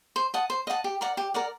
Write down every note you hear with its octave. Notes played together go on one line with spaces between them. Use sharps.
C5
D#5 F#5 A5
C5
D#5 F#5 A5
G4
A#4 D5 F#5
G4
A#4 D5 F#5